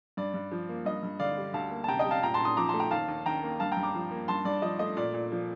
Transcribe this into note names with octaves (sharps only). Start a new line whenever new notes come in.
G2 D5
G2
F3
A#3
G2 D#5
G2
D3 D5 F5
G3
D2 F5 A5
A#3
A5
C3 G5 A#5
D#5 G5
G3
F5 A5
A#2 G5 A#5
A5 C6
A#2
C6 D#6
F3 A#5 D6
A5 C6
A3
G5 A#5
D#2 F5 A5
D#2
D#3 G5 A#5
A#3
G2 F5 A5
G5 A#5
G2
A#5 D6
F3
A#3
G2 A5 C6
G2 D5
F3 D#5
A3 D#5
A#2 D5
A#2
F3